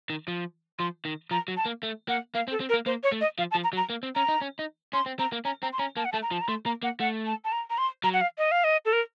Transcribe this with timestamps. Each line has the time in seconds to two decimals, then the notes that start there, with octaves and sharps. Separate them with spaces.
0.10 D#3
0.28 F3
0.79 F3 C6
1.05 D#3
1.31 F3 A#5
1.48 F#3
1.57 A5
1.66 A#3
1.83 A3
2.08 A#3 F#5
2.34 A#3 F5
2.48 C4
2.51 A4
2.60 C4
2.69 A#4
2.74 A#3
2.86 A#3 C5
3.03 C#5
3.12 A3
3.21 D#5
3.38 F3 F5
3.51 A5
3.55 F3
3.64 A#5
3.73 F#3
3.77 A#5
3.90 A#3
4.03 C4
4.15 C#4 A#5
4.29 D#4
4.41 C#4
4.59 D#4
4.93 C#4 C6
5.06 C4
5.19 C4 A#5
5.32 A#3
5.45 C#4 A#5
5.63 C4 A#5
5.73 C6
5.79 C#4 A#5
5.97 A#3 A5
6.05 F#5
6.12 A3 A5
6.22 A#5
6.31 F3 A5
6.41 A#5
6.48 A3 C6
6.65 A#3 A#5
6.83 A#3 F#5
7.00 A3 F#5
7.27 A5
7.45 A5
7.52 A#5
7.70 A#5
7.78 C6
8.04 F#3 A#5
8.14 F#5
8.21 F5
8.38 D#5
8.52 F5
8.64 D#5
8.85 A4
8.93 A#4